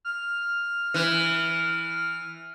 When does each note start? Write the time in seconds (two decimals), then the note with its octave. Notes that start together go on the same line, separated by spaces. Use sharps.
0.05 F6
0.94 E3